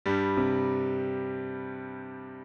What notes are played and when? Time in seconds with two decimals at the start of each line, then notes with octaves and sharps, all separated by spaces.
0.06 G2 G3
0.37 C3